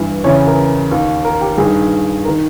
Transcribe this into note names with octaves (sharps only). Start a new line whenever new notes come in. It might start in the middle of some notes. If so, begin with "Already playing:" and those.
Already playing: G2 E3
E2 C#3 E3 C#5
A#4
D#2 D#3
A#4
G4
G2 D#3 G#4
A#4
D#3